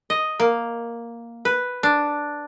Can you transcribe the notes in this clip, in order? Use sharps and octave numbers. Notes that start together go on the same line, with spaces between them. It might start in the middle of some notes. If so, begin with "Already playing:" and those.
D#5
A#3
B4
D4